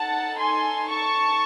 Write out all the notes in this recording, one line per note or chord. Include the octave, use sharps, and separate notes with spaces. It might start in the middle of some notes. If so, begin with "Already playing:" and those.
Already playing: D#4 A4 F#5 A5
G#5 C6
A5 C#6